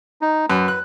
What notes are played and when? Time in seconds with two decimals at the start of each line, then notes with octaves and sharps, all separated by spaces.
0.22 D#4
0.50 F#2 B4
0.68 F#6